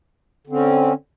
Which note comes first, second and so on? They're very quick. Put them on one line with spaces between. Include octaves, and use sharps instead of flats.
D3 C4 C#4